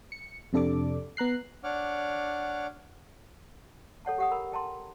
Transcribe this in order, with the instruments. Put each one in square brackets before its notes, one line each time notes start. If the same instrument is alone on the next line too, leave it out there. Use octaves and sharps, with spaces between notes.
[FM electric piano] C#7
F2 C3 D4 A4 D5 D6
B3 A#5 F#6 C7
[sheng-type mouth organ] D4 C#5 F#5 D6 F6
[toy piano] A4 C#5 F#5 A5
G4 F#5 D#6
A#4 A#5 B5
G5 A5 A#5 C6